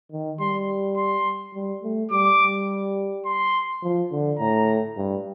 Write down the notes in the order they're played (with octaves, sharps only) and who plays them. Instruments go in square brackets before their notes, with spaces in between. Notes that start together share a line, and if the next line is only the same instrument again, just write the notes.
[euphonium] D#3
[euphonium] G3 [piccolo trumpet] C6
[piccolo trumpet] C6
[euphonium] G3
A3
[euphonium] G3 [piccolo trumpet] D6
[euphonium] G3
[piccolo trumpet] C6
[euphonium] F3
D3
[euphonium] A2 [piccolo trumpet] A#5
[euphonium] G2